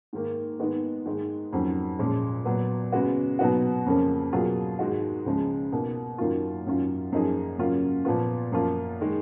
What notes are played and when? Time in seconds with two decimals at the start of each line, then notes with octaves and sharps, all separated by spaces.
0.13 G#2 D#3 A#3
0.59 G#2 D#3 G#3 B3 D#4
1.05 G#2 D#3 G#3 D#4
1.53 F2 D#3 F#3 C#4
1.99 A#2 F3 G#3 C#4
2.45 A#2 F#3 B3
2.92 C#3 G#3 B3 F#4
3.39 B2 F#3 B3 D#4 F#4
3.86 F2 C#3 F3 A#3 C#4
4.33 B2 F#3 A#3 F4 G#4
4.79 G#2 D#3 G#3 D#4 F#4
5.26 C#2 C#3 F3 G#3
5.72 B2 A#3 D#4
6.18 F#2 D#3 F#3 A#3 F4
6.66 F#2 D#3 F#3 C#4 F4
7.12 F#2 F3 A#3 D#4 G#4
7.58 C#3 F#3 A#3 C#4 F4
8.05 A#2 F3 B3 F4
8.52 F#2 F3 A#3 F4
9.00 D#3 G#3